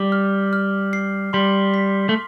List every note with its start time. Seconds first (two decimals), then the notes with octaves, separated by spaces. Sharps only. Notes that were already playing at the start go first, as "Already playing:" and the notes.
Already playing: G3 D6
0.12 F6
0.53 F6
0.93 C7
1.33 G3 C6
1.74 B6
2.09 A3